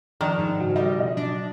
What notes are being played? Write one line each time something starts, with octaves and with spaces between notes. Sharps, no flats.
D#3 F3 D4 D5 F6 C#7 E7
G#2 D#4
C#3 F#4
E3 G3 F#4 A4 D#5
B2 F3 D#5
F#3 D4